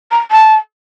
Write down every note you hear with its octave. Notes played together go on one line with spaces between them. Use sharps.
A#5
A5